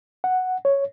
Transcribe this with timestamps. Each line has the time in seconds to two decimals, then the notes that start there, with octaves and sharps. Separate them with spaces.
0.24 F#5
0.65 C#5